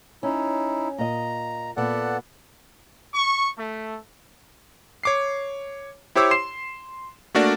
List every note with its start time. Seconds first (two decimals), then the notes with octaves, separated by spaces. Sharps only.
0.23 C#4 D#4 E4
0.98 A#2 D#5 A#5
1.77 A#2 B3 A4 D5 F#5
3.14 C#6
3.56 A3
5.03 C#5 D6 C7
6.15 E4 G4 C5 C#5 D6 E6
6.31 C6 C7 E7
7.35 A3 A#3 D4 F#4 A#4 D5